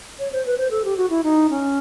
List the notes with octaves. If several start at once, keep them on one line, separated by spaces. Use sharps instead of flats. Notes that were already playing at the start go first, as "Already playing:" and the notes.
C#5
C5
B4
C5
A4
G4
F#4
E4
D#4
C#4